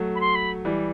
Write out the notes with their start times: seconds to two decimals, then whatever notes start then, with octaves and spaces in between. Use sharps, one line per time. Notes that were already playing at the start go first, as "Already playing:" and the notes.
Already playing: F#3 A3
0.15 B5
0.21 C6
0.35 B5
0.65 E3 G3